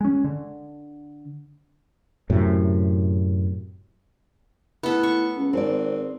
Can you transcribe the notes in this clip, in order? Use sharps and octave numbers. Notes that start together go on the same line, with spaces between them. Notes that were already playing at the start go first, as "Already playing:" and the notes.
G#3 C#4
D3
F#2 A2 C3
A2 B3 A4
C#6
C#2
G#1 C4 D5